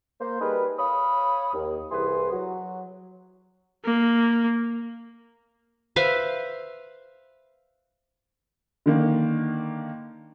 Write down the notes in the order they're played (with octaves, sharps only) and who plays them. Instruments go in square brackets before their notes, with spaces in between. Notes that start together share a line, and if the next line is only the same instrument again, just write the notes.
[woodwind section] A#3 C5
G3 D#4 G#4 A#4 B4
C#5 F5 B5 D#6
D#2
C2 E3 G#4 B4 C6
F#3
[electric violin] A#3
[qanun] B4 C5 E5 F5
[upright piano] D3 D#3 A#3